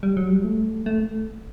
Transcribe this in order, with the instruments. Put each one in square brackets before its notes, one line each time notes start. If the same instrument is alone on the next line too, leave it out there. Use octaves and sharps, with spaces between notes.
[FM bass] G3
F#3
G3
A3
A3